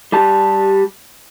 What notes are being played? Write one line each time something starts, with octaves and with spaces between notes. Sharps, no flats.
G3 G4 A5